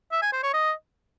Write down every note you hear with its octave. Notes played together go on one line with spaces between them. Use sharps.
E5
G#5
C5
C#5
D#5